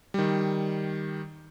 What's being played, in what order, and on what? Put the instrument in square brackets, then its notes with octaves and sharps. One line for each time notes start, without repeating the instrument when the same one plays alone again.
[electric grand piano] D#3 G3